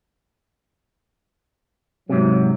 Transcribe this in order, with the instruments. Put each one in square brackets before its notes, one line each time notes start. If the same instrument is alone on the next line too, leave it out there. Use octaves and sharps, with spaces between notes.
[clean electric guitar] G#2 C3 [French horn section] F#3